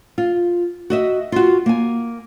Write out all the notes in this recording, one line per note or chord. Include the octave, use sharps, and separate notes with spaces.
F4
F#4 D#5 E5
F4 F#4
A#3 G#5